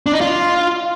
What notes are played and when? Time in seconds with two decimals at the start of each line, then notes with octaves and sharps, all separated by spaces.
0.06 D4
0.13 D#4
0.21 F4